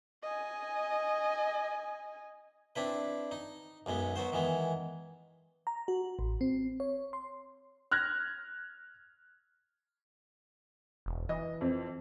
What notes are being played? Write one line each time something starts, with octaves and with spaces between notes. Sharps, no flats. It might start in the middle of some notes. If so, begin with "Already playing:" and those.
D#5 G#5
C4 D4 E4 B4
D#4
B1 F#2 G#3 B3
F#3 B3 F#4 C5
D#3 E3 G#3 B3
A#5
F#4
A1
C4
C#5
C6
F6 F#6 G#6 A#6
E1
E3 D#5
F2 C4